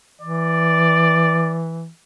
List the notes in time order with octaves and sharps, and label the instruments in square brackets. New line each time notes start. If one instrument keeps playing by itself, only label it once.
[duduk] E3 [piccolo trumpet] D5